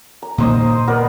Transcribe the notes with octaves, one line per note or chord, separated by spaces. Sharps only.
A#5
A#2 D#3 A#3 D#4 C5 D#5
C6
B3 A#4 D5